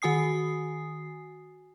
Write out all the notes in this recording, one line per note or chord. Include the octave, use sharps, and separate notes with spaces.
D#3 F#4 G#5 D#6 C7